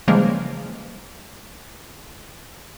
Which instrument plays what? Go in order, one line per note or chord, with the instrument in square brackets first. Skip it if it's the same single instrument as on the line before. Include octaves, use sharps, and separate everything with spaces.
[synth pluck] C#3 E3 F3 G3 G#3 A#3